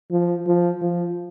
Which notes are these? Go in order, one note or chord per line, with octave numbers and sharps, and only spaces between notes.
F3
F3
F3